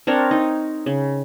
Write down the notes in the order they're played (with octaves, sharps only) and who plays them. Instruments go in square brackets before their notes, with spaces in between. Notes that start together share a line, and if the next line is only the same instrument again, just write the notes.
[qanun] C4 D4 A#4 C#5
D#4
C#3